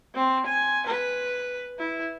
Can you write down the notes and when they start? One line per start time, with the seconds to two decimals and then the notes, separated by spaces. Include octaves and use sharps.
0.15 C4
0.47 G#5
0.87 B4
1.79 E4